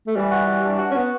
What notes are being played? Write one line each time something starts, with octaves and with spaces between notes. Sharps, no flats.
A3
E3 G3
F#4
E3
D4
F#4
C#4
B3 F#4